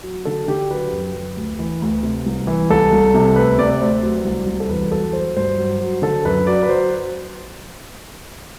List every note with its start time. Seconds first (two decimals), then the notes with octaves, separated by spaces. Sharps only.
0.03 F#3
0.25 D3 A4
0.48 D3 G4
0.70 F#3 B4
0.92 F#2
1.14 F#2
1.36 D2
1.59 E3
1.82 D2
2.03 C3
2.26 C2
2.47 E3
2.70 C2 A4
2.92 C2
3.14 C3
3.36 D2 B4
3.58 C3 D5
3.71 D5
3.80 D2 C5
4.03 F#3
4.25 C2
4.47 C2
4.60 A4
4.69 E2 B4
4.92 F#3 A4
5.13 F#3 C5
5.36 G2 C5
5.58 F#3
5.81 F#3
6.02 D3 A4
6.25 F#2 B4
6.47 F#3 D5
6.62 B4
6.69 F#3 C5